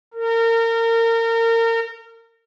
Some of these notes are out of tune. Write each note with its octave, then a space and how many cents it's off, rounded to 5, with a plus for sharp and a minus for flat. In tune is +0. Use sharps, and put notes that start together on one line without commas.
A#4 -30